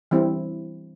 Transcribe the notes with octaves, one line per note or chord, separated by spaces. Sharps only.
E3 G3 C4 E4